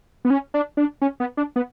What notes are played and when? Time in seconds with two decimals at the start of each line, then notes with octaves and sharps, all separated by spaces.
0.25 B3
0.30 C#4
0.54 D4
0.77 D4
1.02 C#4
1.20 B3
1.37 D4
1.56 B3